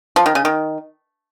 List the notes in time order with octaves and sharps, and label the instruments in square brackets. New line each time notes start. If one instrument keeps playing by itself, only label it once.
[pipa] F3
D#3
C#3
D#3